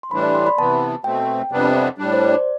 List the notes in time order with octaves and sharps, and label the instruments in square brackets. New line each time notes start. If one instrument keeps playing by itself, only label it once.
[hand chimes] C6
[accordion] A2 E3 G3 D4 [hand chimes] B5
[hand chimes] D5
C6
B5
[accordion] C3 E3 B3 [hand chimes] A5
[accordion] B2 A3 C4 [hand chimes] G5
[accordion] F2 C3 G3 B3 D4
A2 G3 D4
[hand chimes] C5
D5